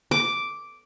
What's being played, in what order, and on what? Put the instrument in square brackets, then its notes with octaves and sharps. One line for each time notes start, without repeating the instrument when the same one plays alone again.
[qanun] D6